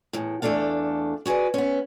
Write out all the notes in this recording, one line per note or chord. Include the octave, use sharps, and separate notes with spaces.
E2 A2
E2 A3 D4 A4 F5
F#4 G#4 A#4 B4 D5
B3 C#4